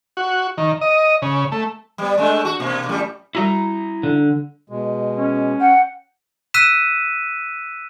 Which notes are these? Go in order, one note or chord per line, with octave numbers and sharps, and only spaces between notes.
F#4
D#3
D#5
C#3
A3
G3 B3
G#3 A3 D4
F#4
B2 A#3
F#2 A2 G3
G3 E4 F#4 A#5
D3
B2 G#3
C#4
F#5 G5
E6 F#6 B6 D#7 E7